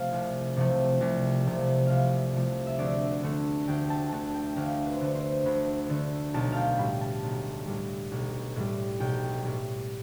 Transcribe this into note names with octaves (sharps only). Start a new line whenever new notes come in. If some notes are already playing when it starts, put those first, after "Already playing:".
Already playing: C3 F3 A3 F5 A5
C2
C3 F3 A3
C2
C3 F3 A3
C2 E5 F5
C3 F3 A3
E5
D2 D5
D3 A3
D2 G5
A5
D3 A3 A5
G5
D2 F5
B4
C5
D3 A3 B4
C5
D2 B5
D3 A3
B1 A5
F5 G5
A2 G3 B5
A5
B1
A2 G3
B1
A2 G3
B1 G5
A2 G3